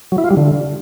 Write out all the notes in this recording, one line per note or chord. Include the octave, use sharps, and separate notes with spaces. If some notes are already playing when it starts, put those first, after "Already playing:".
F#3
E4
F4
G3
D3